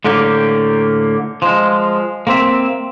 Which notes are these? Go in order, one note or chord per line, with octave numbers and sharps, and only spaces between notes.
A2 D3 A#3 G4
F3 G#3
A#3 C4 E5